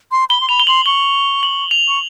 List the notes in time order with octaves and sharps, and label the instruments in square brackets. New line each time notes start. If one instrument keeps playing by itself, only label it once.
[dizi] C6
[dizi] B5 [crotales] G7
[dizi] C6
[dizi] B5 [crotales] F7
[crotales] G7
[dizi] C6 [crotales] F#7
[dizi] C#6 [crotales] G7
[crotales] F#7
F7
[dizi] C#6